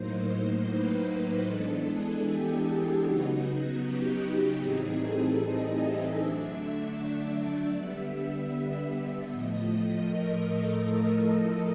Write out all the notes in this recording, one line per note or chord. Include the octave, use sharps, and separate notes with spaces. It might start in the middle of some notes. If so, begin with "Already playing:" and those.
Already playing: A2 F#3 A#3 D#4 C5
C5
B4
E3 G#3 B3 D4 A4
G#4
G4
C#3 F#3 B3 D#4 F#4
G4
A2 E3 G3 C4 D#4 G#4
A4
D#5
E5
D3 F#3 A3 D4 E5
D5
D3 G3 B3 E5
E5
A2 F3 A3 D#5
A#4
A4